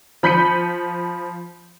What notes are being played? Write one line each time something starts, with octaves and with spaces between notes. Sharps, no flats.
F3 B5 G6 B6 C#7 D#7